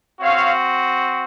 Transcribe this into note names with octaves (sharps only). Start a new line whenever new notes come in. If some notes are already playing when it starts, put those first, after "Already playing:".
C4 F#4 C#5 F5